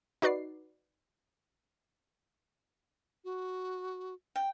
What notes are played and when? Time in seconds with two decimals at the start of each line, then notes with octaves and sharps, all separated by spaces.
0.22 D#4 F#4 B4 D5 C7
3.25 F#4
4.36 G5